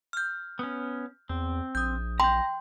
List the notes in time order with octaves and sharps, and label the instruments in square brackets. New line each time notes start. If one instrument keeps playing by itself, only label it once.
[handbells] F6 G6
[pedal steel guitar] B3 C#4
[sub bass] E2 [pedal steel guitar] C4
[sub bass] A#1 [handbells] D#6 G6
[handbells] G5 G6 [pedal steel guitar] A#5 [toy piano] C6